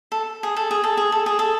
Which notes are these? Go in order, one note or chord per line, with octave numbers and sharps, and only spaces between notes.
A4
G#4
A4
G#4
A4
G#4
A4
G#4
A4